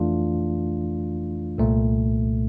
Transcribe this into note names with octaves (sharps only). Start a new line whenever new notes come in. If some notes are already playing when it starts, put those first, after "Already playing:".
Already playing: F2 E3 A3 D4 F4
C2 A#2 A3